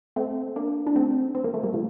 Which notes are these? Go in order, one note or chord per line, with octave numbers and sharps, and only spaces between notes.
A3 C4
A#3 D4
D4
A3 C4
C4
A#3
A3
G3 A#3
F3 A3